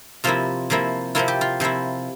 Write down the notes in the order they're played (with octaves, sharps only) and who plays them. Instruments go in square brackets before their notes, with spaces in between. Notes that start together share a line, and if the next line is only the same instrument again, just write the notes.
[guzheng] C3 F3 A#3 E4 F4
C3 F3 A#3 E4
C3 F3 A#3 E4 F4
G4
F4
C3 F3 A#3 E4